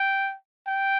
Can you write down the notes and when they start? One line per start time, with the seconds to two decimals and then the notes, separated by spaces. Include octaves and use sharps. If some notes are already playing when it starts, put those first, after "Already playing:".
Already playing: G5
0.68 G5